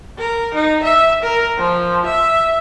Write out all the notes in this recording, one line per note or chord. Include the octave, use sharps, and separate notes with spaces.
A#4
D#4
E5
A#4
F3
E5